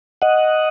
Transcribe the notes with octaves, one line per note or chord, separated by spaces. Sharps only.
D#5 F#5